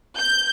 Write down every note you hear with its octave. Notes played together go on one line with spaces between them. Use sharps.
G6